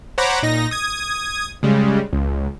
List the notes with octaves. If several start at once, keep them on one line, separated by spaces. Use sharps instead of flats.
C5 C#5 F#5 A#5 B5 D6
A#2 D#4 A#6
D#6 G#6
C#3 G3 G#3
C#2